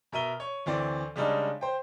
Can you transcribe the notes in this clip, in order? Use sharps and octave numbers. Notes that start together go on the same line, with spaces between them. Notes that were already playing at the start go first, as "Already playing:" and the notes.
B2 A#4 E5 D#7 G7
C#5
D2 E3 C4 D5
C#3 G3 G#3 D4 D#4
C5 G5